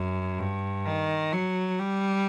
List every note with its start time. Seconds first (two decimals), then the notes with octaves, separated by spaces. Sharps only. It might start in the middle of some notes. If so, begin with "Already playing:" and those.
Already playing: F#2
0.39 G2
0.86 D#3
1.32 F#3
1.79 G3